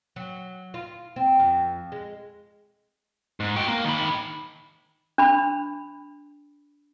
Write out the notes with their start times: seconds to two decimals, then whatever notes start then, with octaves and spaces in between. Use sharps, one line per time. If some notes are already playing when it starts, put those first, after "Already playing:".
0.16 F#3
0.74 F4
1.16 C4
1.40 F2
1.92 G#3
3.40 G#2
3.56 F#4 G5
3.68 A#3
3.85 D#3 B5
5.18 D4 B5